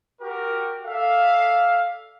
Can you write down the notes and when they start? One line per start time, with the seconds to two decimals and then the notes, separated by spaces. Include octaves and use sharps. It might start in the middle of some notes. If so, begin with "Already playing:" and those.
0.21 F#4 G4 A#4
0.85 A4 D5 E5 F5